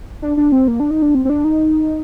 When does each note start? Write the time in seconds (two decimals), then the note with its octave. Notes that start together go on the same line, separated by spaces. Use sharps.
0.22 D4
0.37 D4
0.52 C4
0.68 A#3
0.80 D4
0.91 D#4
1.02 D4
1.15 C4
1.25 C4
1.30 D4
1.44 D#4